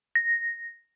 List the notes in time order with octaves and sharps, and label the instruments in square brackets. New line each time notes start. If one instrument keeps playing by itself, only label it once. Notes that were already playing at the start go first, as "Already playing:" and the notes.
[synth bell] A#6